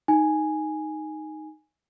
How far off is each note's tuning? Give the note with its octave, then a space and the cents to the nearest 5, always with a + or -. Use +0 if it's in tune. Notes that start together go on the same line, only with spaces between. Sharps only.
D#4 +0 G#5 +0